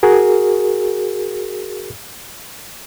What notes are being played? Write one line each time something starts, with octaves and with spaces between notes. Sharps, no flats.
F#4 G#4 A#4